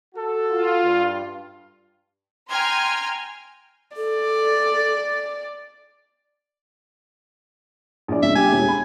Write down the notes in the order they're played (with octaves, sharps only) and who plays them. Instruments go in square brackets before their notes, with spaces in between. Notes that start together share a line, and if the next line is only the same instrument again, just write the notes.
[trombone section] F#4 A4
[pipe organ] F4
[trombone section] G2
[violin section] G5 G#5 A#5 C6 F6 G#6
[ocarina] A4 [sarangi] D5
[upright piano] A#1 D5
[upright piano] C#2 [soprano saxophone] E5
[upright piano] G2 G4 [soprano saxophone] G#5
[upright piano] E1
B5